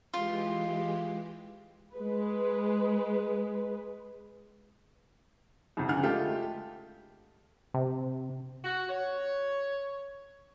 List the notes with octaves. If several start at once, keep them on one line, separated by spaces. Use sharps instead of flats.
E3 G#3 F4 G4
G#3 B4
C2 F2
D2 C#3 F#5 F6
G#3 A3 F4 G4
C3
F#4
C#5